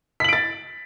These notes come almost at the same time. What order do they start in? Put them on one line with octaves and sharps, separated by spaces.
B6 F#7 D7 A6